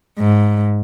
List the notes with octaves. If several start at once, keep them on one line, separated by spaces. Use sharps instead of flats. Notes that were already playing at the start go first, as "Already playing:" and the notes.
G#2